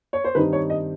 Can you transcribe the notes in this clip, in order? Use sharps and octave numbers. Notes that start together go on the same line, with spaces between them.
C#5
C5
G2 D#3 G3 C4 D#4 B4
C#5
D#5